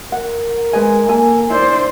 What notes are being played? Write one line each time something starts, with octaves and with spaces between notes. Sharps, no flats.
A#4 F#5
G#3 B4 D#5 G#5
A#3 A4 G#5
E4 C5 D5